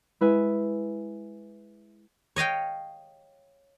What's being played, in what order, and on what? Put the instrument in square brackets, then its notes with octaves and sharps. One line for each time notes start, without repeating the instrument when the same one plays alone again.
[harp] G#3 E4 B4 E5 G#5
[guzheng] C#5 D#5 F5 G5